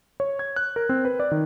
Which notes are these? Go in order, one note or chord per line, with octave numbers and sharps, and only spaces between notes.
C#5
G#6
F#6
A#4
C4
B4
D5
D#3